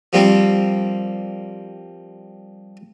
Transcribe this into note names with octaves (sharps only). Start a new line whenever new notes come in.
F3 G3 A#3 C4